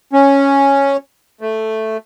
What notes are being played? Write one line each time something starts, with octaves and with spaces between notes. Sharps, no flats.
C#4
A3